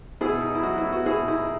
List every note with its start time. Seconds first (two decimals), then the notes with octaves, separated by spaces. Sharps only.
0.21 B2 E4 G#4
0.42 D#4
0.55 E4
0.63 F#3 F#4
0.78 E4
0.84 B3
0.92 F#4
1.06 B2 E4 G#4
1.28 D#4 E4